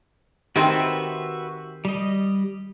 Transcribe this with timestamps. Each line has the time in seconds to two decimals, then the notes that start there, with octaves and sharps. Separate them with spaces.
0.56 D#3 C4 F#4 G4 B4 E5 C6
1.85 G3 D#5